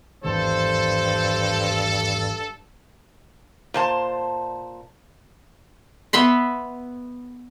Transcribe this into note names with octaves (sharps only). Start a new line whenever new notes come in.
G#1 E2 G2 A4 C5
A#2 C5 A5
B3 E5 B5 C6